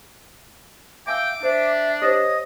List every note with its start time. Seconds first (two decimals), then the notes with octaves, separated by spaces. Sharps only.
1.07 E5 F5 G5 G#5 D6 E6
1.43 D4 C5 E5
2.02 G4 C5 C#5 D#5